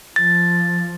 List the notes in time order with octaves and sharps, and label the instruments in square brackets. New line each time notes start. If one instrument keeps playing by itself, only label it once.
[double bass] F3 [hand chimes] A6